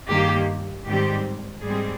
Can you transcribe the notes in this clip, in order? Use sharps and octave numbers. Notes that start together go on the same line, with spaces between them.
G2 D#3 A#3 G4
G#2 D#3 G3 C4 G4
G#2 G3 C4 G#4